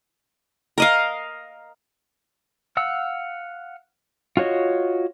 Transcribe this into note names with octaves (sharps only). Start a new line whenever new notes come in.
A#4 D#5 F5
F5 F#5 E6
F4 F#4 C#5 D#5